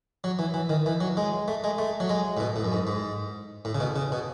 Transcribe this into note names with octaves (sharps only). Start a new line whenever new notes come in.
F#3
E3
E3
D#3
E3
F#3
G#3
A3
G#3
A3
F#3
G#3
A2
B2
A2
F#2
G#2
G#2
A2
C#3
B2
C#3
B2